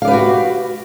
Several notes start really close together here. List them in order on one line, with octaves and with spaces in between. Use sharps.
F5 D5 B4 G4 F#4